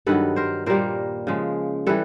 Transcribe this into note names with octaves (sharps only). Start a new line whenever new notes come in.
G2 D#3 F#3 A4 B4
A#4 C5
A#2 G3 A#3 A#4 C5
C#3 F3 G#3
E3 G3 A4 B4